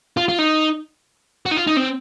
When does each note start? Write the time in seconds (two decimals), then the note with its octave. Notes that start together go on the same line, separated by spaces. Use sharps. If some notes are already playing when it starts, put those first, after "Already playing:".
0.17 F4
0.28 F4
0.39 D#4
1.46 F#4
1.51 D#4
1.56 F4
1.67 D#4
1.77 C4